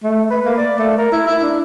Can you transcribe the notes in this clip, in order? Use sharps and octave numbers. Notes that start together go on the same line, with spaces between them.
A3
B4
A#3
D5
A3
A#4
E4
E4
D4